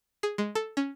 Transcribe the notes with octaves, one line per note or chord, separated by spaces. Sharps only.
G#4
G#3
A4
C#4